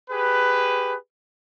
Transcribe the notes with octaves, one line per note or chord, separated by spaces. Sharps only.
G4 G#4 B4